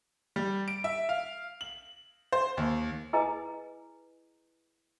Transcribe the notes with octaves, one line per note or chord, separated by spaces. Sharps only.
G3
D7
E5
F5
F#7
C5
D#2
E4 G#4 B4 D#5 G#5 A#5